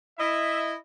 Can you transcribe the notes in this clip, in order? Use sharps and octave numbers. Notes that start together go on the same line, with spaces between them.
E4 D#5 E5